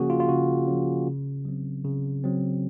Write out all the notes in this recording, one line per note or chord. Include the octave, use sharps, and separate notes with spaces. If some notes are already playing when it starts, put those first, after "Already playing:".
Already playing: C#3 F3 A#3 C#4 F#4 G#4
F4
F4
C#3 F#4
F3 A#3 C#4
C#3
F#3 C4
C#3
F#3 C4